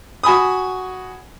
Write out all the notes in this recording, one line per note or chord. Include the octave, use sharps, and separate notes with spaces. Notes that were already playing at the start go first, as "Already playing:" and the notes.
F#4 G#5 B5 D#6